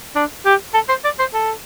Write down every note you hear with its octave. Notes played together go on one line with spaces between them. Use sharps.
D4
G4
A4
C5
D5
C5
A4